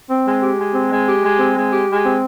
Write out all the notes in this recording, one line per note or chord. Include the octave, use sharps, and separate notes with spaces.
C4
G#3
G4
G#3
C4
G#3
G4
G#3
C4
G#3
G4
G#3
C4